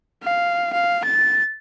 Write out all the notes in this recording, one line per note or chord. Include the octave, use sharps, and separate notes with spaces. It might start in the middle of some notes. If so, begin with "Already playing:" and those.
F5
F5
A6